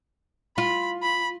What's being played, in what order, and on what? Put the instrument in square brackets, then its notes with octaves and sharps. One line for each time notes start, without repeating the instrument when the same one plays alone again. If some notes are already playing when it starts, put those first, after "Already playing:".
[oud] F4 [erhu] B5
[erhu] B5